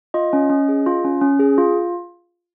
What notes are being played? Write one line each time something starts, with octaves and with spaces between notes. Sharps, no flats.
F4 D#5
C#4
C#4
G#4
F4
C#4
C#4
G#4
F4